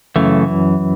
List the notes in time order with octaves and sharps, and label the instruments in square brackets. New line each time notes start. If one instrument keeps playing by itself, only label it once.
[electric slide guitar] F#2 C#3 E3 A3